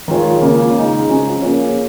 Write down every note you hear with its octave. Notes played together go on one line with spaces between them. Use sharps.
D#3 G#3 F4 C#5
C#3 A#3 F4 C#5
C#3 G#3 D#4
C#3 F3 C#4
A#3 C#4 F4 G#4 C#5